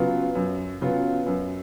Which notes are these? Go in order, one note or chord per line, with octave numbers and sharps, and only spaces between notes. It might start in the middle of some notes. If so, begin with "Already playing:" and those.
Already playing: C#3 F#3 B3 F4
F#2
C#3 F#3 B3 F4
F#2